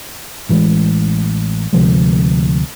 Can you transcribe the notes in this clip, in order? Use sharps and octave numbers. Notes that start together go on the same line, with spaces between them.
A1 E3 G#3
D2 C3 F3 G#3